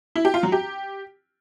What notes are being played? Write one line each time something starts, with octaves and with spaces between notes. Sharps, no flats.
E4
G4
F4
F#3
G4